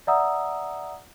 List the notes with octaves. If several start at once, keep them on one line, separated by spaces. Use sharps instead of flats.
D5 E5 F#5 A#5 D#6 E6